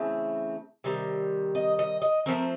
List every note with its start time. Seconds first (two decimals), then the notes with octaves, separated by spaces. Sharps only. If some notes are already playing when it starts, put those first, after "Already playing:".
Already playing: C#3 E3 A3 C4
0.84 C3 D#3 G3
1.55 D#5
1.79 D#5
2.02 D#5
2.26 F3 A3 C4 A#4